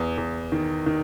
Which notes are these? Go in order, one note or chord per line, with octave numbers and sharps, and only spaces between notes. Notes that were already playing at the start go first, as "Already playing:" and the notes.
Already playing: E2
E2
D#3
D#3